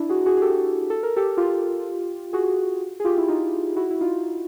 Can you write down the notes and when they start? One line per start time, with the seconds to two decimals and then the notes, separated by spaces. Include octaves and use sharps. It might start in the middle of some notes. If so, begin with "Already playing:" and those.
Already playing: D4 E4
0.09 F#4 G#4
0.26 F#4 G#4
0.37 G#4
0.42 G4 A4
0.90 A4
1.03 A#4
1.17 G4 A4
1.37 F4 G4
2.33 F#4 G#4
3.00 G#4
3.04 F4 G4
3.17 E4
3.28 D#4 F4
3.76 E4 F#4
3.90 E4
4.01 D#4 F4